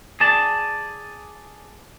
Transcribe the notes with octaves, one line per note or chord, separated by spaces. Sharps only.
G#4 D5 A5